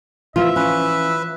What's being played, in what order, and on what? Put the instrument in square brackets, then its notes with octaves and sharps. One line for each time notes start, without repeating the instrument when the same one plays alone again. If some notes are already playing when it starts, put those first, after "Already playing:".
[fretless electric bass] E3 F3 [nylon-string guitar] B3 F4 [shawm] E5
[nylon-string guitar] C#4 [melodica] B4